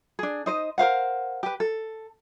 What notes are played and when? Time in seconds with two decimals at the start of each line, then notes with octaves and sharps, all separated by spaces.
0.19 D4 G#4
0.46 D#4 C5 D#5
0.78 A#4 C5 F5 F#5
1.43 G4 B4
1.60 A4